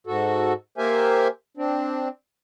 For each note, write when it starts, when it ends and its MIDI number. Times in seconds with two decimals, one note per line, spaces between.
0.07 0.53 44
0.07 0.53 66
0.07 0.53 69
0.78 1.28 58
0.78 1.28 67
0.78 1.28 70
0.78 1.28 72
0.78 1.28 76
0.78 1.28 80
1.57 2.08 60
1.57 2.08 62